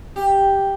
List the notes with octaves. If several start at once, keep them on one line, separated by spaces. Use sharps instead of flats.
G4